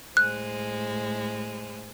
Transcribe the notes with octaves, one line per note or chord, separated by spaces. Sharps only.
A2 G#3 C5 F#6